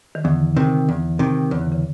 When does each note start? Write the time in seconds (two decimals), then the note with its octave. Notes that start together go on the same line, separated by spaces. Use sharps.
0.15 D#3
0.24 E2 D3
0.56 C3 D#3
0.89 E2
1.19 C3 D#3
1.51 E2 C#3
1.61 D3
1.72 C#3